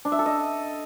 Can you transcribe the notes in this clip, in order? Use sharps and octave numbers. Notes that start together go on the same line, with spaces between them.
D4
E5
A4
D#5